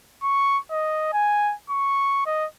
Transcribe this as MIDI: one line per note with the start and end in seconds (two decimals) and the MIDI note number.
0.23 0.58 85
0.71 1.12 75
1.13 1.54 80
1.70 2.22 85
2.26 2.46 75